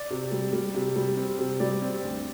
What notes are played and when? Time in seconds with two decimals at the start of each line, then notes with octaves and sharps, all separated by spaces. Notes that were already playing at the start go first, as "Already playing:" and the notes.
Already playing: D5
0.11 C3
0.32 G3
0.53 G3
0.75 C3
0.96 G3
1.17 C4
1.39 C3
1.60 G3 D5
1.82 C4
2.03 D2